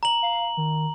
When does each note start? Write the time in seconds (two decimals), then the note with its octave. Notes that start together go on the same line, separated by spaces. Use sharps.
0.03 A#5 F#7
0.22 F5
0.57 D#3